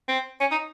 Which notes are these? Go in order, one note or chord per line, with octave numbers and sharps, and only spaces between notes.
C4
C#4
D#4